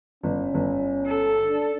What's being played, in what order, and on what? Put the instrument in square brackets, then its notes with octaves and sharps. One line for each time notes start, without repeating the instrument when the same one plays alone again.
[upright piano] G1 [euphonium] C#4
[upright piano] G1
[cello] A4
[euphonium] D4